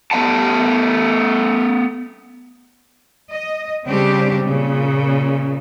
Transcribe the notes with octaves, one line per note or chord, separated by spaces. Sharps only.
A3 B3 F5 F#5 A5
D#5
C#3 G3 C4 D4 G4
A#2 C#3